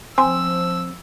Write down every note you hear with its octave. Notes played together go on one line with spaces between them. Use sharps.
F3 C4 G#5 C6 E6